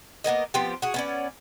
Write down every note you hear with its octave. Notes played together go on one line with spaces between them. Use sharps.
A#3 B3 A#4 D#5
F3 B3 C4 G4
F#4 G#4
B3 C#4 D5